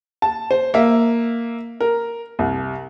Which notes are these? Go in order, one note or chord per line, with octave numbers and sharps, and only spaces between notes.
A5
C5
A#3 E5
A#4
C2